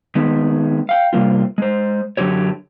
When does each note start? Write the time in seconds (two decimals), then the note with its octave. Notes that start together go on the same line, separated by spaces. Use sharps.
0.15 D#3 G#3 B3
0.89 F5 G5
1.13 C3 G3 A#3 F4
1.58 G#3 C5
2.17 F#2 D3 F#3 G4 C#5